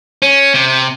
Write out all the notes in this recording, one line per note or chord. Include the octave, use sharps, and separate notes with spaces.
C#4
C3